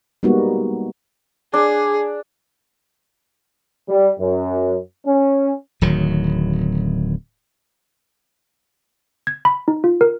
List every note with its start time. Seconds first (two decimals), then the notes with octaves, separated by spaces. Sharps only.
0.23 G3 G#3 A#3 B3 D#4 F#4
1.54 D4 G#4
3.89 G3
4.20 F#2
5.05 C#4
5.81 D1 D#3 F#3
9.27 G#6
9.45 B5
9.68 D#4
9.84 F4
10.01 A#4